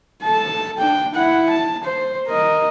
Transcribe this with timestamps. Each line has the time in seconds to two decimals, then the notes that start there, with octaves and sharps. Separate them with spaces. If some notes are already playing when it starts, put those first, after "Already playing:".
0.23 A4 A5
0.78 D4 G5
1.14 E4 F#5
1.50 A5
1.84 C5
2.28 A#4 D#5